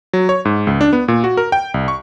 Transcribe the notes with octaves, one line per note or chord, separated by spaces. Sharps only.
F#3
C#5
G#2
C#2
D4
B3
A#2
F#4
A#4
G5
C2
C#6